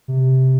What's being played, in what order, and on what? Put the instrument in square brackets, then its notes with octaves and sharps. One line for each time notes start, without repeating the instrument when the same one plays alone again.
[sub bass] C3